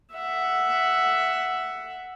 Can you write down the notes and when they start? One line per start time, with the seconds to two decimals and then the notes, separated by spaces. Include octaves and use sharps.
0.14 E5 F#5